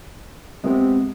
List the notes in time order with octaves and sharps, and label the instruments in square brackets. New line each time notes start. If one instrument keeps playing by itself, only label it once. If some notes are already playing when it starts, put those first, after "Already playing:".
[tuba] C3 [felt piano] G#3 B3